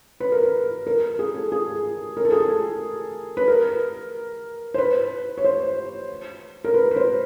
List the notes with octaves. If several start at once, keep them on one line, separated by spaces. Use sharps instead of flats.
B4
A#4
B4
A#4
G#4
A4
G#4
A#4
A4
G#4
A4
B4
A#4
C5
B4
C#5
C5
A#4
B4
B4
C5